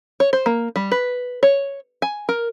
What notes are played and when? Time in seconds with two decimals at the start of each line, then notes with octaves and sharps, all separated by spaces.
0.20 C#5
0.33 C5
0.46 A#3
0.76 G3
0.92 B4
1.43 C#5
2.02 G#5
2.29 A#4